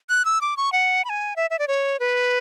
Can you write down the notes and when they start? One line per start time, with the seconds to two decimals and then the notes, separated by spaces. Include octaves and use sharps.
0.09 F#6
0.25 E6
0.41 D6
0.57 C#6
0.72 F#5
1.05 B5
1.09 G#5
1.36 E5
1.50 E5
1.59 D5
1.68 C#5
2.00 B4